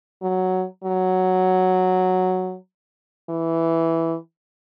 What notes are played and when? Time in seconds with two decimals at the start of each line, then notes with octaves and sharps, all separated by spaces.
0.22 F#3
0.84 F#3
3.30 E3